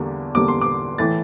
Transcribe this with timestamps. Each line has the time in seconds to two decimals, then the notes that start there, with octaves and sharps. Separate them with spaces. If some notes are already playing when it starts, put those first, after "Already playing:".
Already playing: E2 D3 G3 A#3
0.35 E2 D3 G3 A#3 D6
0.48 C6
0.61 D6
0.98 A2 E3 A3 A6